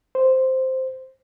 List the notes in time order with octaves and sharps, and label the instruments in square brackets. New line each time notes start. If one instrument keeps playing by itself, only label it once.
[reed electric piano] C5